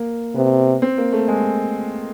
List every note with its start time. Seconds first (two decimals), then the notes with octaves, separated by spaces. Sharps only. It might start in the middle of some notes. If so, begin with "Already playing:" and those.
Already playing: A#3
0.35 C3 B3
0.82 C4
0.98 A#3
1.13 A3
1.28 G#3